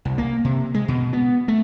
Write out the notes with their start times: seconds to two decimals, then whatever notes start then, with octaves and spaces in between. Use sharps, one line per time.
0.05 C2
0.18 A#3
0.45 C3
0.74 G#3
0.88 B2
1.13 B3
1.48 A3